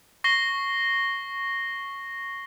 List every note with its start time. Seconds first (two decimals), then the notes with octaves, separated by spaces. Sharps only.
0.24 C#6 A#6 C7 G7